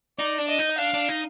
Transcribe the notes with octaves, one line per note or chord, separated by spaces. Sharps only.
D#4 D5
D4
D#5
D#4
D4 F5
D4
D#4